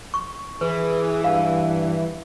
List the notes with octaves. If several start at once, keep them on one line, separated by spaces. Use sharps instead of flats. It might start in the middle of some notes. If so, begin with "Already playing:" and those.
C#6
E3 G#4 B4
G2 F5